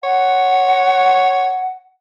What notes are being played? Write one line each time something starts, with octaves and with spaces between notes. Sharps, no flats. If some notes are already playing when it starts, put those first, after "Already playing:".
C#5 F#5